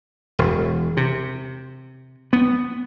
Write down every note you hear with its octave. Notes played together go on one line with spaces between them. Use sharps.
E1
C3
B3